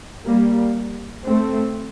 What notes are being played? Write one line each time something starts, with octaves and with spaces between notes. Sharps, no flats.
G3 A#3
A3 C4